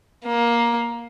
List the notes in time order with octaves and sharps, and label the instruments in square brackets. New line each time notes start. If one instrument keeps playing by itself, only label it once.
[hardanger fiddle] A#3